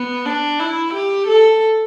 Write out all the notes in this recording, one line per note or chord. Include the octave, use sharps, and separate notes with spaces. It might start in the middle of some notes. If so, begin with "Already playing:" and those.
Already playing: B3
D4
E4
G4
A4